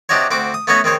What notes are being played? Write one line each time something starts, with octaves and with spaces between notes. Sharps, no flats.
C3 D4 D#4 F#4 C#5
D2 C4 F#4 D6
D#6
A3 B3 C#4 F#4 C#5 D#5
D#3 C4 G#4 C#5